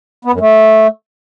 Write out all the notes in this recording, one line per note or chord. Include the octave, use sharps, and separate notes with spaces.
B3
F#2
A3